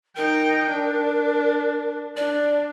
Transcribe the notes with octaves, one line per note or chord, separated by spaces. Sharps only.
D#4 A#4 G5
D4
D4 D5